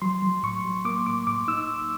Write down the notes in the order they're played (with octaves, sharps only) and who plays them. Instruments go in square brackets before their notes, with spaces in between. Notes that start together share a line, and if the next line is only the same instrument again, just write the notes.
[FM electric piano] F#3 C6
F#3
A2 C#6
F#3
A#3 D6
A2 D6
A2 D6
D#4 E6